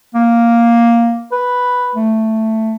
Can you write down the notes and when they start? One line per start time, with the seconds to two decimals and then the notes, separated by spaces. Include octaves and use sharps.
0.14 A#3
1.32 B4
1.95 A3